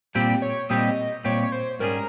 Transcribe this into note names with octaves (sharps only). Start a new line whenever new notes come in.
A#2 G3 C4 G4 G5
C#5
A#2 G3 C4 G4 D#5
A#2 G3 C4 G4 C#5
C#5
C5
G#2 G3 C#4 G#4 A#4